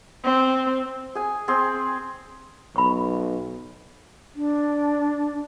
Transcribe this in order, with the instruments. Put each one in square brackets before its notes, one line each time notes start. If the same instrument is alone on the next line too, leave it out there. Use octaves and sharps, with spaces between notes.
[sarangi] C4
[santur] G#4 G#5
C4 G#4
[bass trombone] B1 [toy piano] B5 C#6
[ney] D4